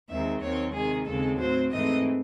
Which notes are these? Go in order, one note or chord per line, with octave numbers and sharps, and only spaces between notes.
D#2 D#3 G#3 C4 E5
D#2 D#3 F#3 C4 C#5
C3 D#3 G#3 G#4
D#2 C#3 G#3 C4 A4
A2 F#3 C4 C5
G#2 E3 A3 C4 D#5